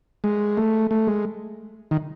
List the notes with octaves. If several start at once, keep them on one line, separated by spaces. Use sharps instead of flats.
G#3
A3
A3
G#3
D#3